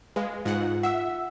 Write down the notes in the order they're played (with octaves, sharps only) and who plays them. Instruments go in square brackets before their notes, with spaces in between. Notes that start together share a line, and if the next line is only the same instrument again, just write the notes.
[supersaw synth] G#3 [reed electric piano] B4 F5
[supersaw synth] G#2 F#5 [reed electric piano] F4
[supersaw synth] E5 [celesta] F#5 E6